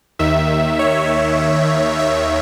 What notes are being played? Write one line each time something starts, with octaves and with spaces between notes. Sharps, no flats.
D#2 D#3 E5
C#5
E5